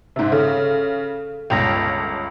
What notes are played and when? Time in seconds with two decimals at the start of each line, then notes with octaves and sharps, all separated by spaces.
0.16 G#2 C3
0.32 C#3 A4
1.50 G1 C#2 G5 A#6